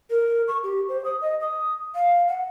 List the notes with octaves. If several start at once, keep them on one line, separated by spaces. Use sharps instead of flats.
A#4
C#6
G4
C5
D#6
D#5
D#6
F5
F#5